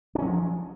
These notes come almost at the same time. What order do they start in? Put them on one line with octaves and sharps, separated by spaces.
D4 C#4 F#3 F3